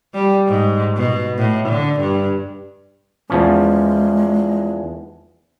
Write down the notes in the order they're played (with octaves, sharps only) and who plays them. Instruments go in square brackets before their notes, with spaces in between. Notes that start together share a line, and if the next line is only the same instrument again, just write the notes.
[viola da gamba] G3
G#2
B2
A2
D3
G2
[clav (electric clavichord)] E2 F3 C#4 [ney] G#3